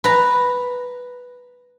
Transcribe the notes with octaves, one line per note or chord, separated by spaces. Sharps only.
B4 A#5